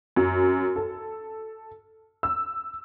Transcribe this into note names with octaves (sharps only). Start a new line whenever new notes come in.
F#2
A4
E6